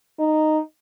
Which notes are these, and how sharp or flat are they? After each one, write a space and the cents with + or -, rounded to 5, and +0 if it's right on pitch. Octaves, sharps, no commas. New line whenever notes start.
D#4 -10